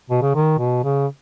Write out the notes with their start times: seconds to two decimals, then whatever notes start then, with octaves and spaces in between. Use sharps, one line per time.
0.10 B2
0.22 C#3
0.35 D#3
0.59 B2
0.84 C#3